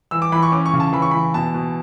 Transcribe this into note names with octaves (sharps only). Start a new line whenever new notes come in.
E3 E6
D6
E3 B5
C#6
C#4 D6
C#6
C#3
A5
E3 B5
C#6
E3 B5
B2 A5
B2